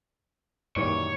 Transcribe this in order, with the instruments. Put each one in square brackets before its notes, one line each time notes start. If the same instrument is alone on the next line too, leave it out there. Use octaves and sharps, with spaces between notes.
[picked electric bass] F#2 A#2 [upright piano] D#3 E3 G3 [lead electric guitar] C#5